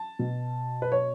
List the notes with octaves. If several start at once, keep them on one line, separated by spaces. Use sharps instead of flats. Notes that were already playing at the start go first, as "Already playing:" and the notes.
Already playing: A5
B2
B4
C#5